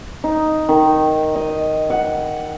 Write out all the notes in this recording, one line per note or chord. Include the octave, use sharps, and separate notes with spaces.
D#4
D#3
D#5
F#5